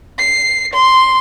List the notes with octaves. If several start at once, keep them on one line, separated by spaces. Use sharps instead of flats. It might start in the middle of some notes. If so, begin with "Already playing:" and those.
C7
C6